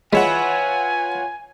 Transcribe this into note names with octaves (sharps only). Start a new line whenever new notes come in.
G#3 F4 B4 C#5 E5 F#5 G#5